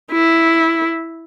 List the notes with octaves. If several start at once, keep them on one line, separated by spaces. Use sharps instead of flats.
E4